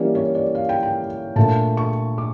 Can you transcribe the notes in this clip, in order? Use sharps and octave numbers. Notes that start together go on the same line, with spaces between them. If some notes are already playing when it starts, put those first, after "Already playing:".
Already playing: E3 G3 A#3 C#4 D5
C#5
D5
F5
G5
G5
A#2 A3 D4 A5
C#6
D6